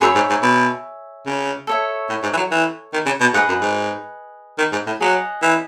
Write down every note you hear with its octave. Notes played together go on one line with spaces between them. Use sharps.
F#2 G#4 C#5 E5 B5
G#2
G#2
B2
C#3
A4 C#5 E5
A2
G#2
E3
F#3
E3
D#3
C#3
B2
G#2 G#4 B4 D#5 F#5
F#2
G#2
D#3
G#2
A2
F#3 G#4 D#5 F#5
E3